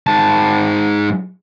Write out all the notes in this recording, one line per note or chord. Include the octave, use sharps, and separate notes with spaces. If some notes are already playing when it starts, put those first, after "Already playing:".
G#2 A5